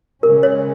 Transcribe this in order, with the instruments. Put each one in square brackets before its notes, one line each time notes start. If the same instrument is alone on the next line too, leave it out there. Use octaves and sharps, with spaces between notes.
[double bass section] C#3 G#3 C#4 [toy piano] A#4
[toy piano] C#5